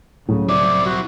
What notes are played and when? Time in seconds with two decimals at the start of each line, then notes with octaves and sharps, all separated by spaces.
0.28 C#2 A2 C#3 F#3
0.49 C4 E4 D5
0.86 F#4